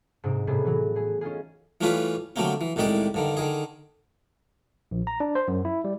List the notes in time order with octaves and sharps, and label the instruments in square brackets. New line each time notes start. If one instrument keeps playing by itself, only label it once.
[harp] G#2 C3 C4 D#4 D7
A2 C3 G3 B3 E4 G#4
E3 F#3
A3 G#4
C#4 D#4 F4 G#4
[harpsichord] E3 G3 A3 C#4 F4 B4
D3 F#3 G3 A3 A#3 C4
E3
C2 A2 D#3 G#3 G4 D5
G2 D3 D#3
D3 D#3 G#4
[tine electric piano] A#1
A#5
D4
C5
F#2
E4
G3